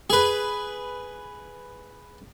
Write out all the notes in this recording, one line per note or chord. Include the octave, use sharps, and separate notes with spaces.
G#4 B4